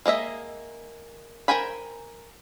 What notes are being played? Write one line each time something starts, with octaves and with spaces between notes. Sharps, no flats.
G#3 A#3 D#5 E5
A#4 C5 G5 G#5 B5